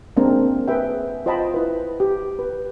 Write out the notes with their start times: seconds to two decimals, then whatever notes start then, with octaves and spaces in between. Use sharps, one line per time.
0.17 G#3 A#3 C4 D4 A#4
0.68 G#4 B4 E5 G5
1.26 F4 C5 D#5 G5 A5 B5
1.54 E4 B4
2.00 G4
2.39 B4